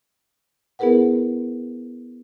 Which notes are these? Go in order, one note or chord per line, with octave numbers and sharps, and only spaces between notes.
B3 E4 G#4 A#4 B4 F#5